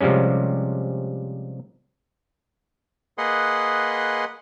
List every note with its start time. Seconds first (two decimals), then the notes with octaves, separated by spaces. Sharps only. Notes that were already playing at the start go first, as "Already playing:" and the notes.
0.01 C3 F3 G3 G#3 C#4
3.18 A#3 G#4 B4 D#5 F#5 C6